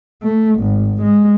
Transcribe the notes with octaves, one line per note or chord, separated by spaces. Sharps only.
A3
G#1
G#3